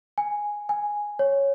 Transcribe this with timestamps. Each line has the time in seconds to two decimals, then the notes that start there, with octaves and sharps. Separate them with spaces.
0.18 G#5
0.69 G#5
1.19 C#5